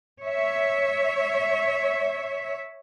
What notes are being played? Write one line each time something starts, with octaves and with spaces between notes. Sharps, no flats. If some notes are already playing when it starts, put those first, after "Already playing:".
C#5 E5